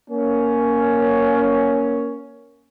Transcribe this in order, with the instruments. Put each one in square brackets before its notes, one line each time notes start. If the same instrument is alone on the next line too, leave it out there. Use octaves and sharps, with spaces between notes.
[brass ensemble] A#3 C#4